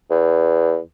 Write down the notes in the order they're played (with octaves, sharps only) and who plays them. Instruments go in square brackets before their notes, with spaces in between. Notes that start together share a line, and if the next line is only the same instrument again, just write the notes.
[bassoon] E2